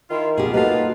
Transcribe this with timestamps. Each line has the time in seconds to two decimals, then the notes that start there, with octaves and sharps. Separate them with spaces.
0.10 D#3 E4 F4
0.38 B2 F4 G4 G#4
0.54 A#3 D#4 F4 F#4 A4 B4